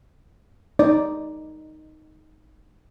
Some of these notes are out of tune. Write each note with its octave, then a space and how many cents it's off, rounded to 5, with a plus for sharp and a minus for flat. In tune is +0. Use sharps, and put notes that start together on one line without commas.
D#4 +0 D5 +0